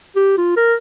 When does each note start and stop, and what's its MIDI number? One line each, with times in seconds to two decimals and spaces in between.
0.16 0.35 67
0.38 0.54 65
0.57 0.75 70